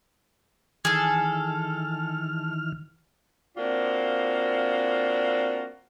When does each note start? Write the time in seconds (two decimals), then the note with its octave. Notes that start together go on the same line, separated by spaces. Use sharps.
0.85 D#3 E3 G#4 A4 F6
3.57 A#3 C4 D4 F4 F#4